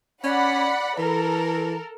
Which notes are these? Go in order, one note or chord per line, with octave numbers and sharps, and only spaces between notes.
C#4 D5 F#5 B5
E3 A4 A#4